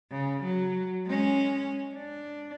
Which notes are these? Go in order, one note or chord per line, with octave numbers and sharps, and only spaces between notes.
C#3
F#3
G#3 C#4
D4